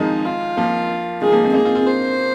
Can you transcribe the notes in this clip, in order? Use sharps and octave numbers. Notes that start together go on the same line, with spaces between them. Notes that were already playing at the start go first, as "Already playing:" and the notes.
Already playing: D#3 F3 G#3 C4 D#4
F4
F3 A#3
D#3 G#3 G#4
F3 A#3
G#3 C4
A#3 D#4 G#4
C4 F4
C4 F4
C5